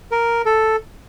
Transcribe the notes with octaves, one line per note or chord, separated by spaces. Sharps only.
A#4
A4